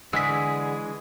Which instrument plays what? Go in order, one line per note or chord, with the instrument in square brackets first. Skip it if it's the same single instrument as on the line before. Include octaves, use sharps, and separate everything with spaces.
[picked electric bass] D3 [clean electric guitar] E3 G#3 [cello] G#4 [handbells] E6 B6